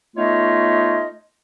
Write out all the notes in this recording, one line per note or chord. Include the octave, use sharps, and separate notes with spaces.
A3 B3 D#4 F4 C#5 D#5